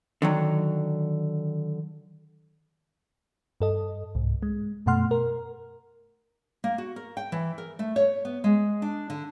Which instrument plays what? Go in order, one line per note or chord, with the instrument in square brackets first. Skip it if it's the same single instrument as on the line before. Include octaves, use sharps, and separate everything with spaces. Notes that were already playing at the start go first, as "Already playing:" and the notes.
[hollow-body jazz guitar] D3 D#3 F#3
[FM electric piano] G2 A4 D#5
C2 G#2
G#3
F#2 B2 A3 F#5 C6 F6
A#4
[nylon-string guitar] A#3
F#4
A#4
G5
E3
A#4
A3
C#5
B3
G#3
D4
D3